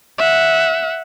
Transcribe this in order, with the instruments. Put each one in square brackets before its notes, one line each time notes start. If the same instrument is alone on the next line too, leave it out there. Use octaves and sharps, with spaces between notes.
[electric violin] E5 F#5